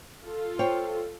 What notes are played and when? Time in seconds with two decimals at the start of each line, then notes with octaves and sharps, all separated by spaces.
0.24 F4 A4
0.59 C5 C#5 G5